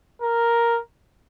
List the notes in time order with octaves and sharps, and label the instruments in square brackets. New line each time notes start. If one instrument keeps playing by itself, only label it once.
[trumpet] A#4